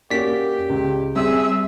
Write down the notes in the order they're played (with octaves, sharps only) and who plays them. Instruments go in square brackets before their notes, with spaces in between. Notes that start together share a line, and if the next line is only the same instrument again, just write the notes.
[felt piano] A#3 C#4 F#4 [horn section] G4 [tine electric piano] D5 B6
[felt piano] C#2
[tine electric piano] G3 [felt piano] C4 E6 [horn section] G#4 [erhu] E5